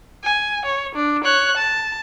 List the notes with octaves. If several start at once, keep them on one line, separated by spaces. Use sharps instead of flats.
G#5
C#5
D4
C#5 F#6
A5